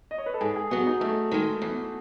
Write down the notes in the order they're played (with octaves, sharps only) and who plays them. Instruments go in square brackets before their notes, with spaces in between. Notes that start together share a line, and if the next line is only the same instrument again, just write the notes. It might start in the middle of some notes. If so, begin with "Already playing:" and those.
[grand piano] D#5
C#5
B4
A4
[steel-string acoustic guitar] G#2 [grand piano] G#4
[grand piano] G#4
[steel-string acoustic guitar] F#3 B3 [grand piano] F#4
[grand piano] D#4
[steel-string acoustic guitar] F#2 [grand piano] A3
[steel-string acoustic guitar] D#3 G#3
E2